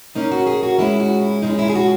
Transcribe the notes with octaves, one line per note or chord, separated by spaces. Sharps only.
A#2 A#3 C#4 D#4
F#4
G#4
F#4
A#2 G#3 C#4 E4
F#4
E4
A#2 G#3 C#4 D#4
E4
G#4
F#4